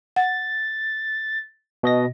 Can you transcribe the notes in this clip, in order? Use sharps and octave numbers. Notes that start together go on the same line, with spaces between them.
F#5 A6
B2 D#5 A#6